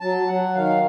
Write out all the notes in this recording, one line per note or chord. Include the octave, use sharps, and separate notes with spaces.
F#3 A5
F#3 F#5
D#3 F5